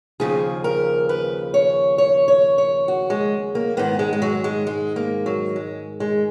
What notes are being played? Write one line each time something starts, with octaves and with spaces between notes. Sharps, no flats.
D#2 C#3 F3 G#4
A#4
B4
C#5
C#5
C#5
C#5
F#4
G#3
A#3
G#2 D#3 B3
G#3
G#3
F#3
G#3
G#3
A#3
F#3
G#3
G#3